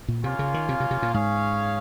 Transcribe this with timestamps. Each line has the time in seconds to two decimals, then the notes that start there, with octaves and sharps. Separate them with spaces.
0.08 A#2
0.23 C3 A#3 C#4 F4
0.39 C#3
0.54 D#3
0.69 C3
0.80 C3
0.91 C3
1.02 A#2
1.14 G#2 C#4 G#4 C#5 F5